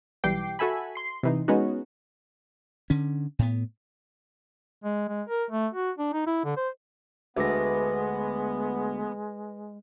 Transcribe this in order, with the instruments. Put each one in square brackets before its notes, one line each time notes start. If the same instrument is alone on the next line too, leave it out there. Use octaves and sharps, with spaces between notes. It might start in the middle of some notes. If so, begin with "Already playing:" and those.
[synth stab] B1 E3 G3 G5 D6 C7
F#4 A4 E5 G#5 B5
C6 C7
C3 E3 D#4
G#3 B3 C#4 D#4 F#4
[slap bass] D3 C#4
A2 B3
[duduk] G#3
G#3
A#4
A3
F#4
D4
D#4
E4
D3
C5
[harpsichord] D2 [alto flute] G#3 [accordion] B3 [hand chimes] B4 A#6